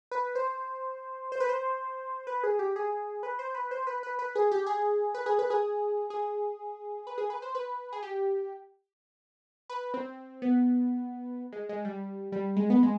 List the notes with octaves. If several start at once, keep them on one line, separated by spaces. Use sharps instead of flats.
B4
C5
C5
B4
C5
B4
G#4
G4
G#4
B4
C5
B4
C5
B4
B4
B4
G#4
G4
G#4
B4
G#4
B4
G#4
G#4
B4
G#4
B4
C5
B4
G#4
G4
B4
C4
B3
G#3
G#3
G3
G3
G#3
B3
G#3